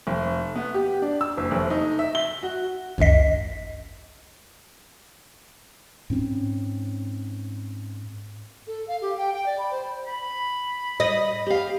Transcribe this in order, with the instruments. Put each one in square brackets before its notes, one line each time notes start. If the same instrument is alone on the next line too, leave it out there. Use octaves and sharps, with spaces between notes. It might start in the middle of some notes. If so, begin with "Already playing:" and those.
[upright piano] F1
B3
G4
D4
E6
F#1
F1
D#4
E5
G7
F#4
[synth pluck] G#1 C#2 F#2 D#5 B6
[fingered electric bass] G#2 C4 C#4
[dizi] A4
F5
G4
G5
G5
D5
B5
C5
[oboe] B5
[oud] D#5
[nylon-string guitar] G4 F5